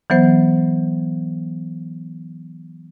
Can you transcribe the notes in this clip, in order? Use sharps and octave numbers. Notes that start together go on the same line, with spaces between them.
E3 F#3 B3 C5